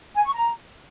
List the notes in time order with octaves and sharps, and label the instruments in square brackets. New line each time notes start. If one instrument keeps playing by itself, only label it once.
[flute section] G#5
C#6
A#5